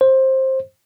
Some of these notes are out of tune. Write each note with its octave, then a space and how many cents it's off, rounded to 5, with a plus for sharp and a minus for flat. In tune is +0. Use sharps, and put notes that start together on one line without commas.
C5 +15